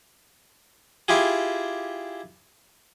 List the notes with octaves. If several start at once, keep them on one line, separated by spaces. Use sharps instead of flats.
E4 F4 G4 G#4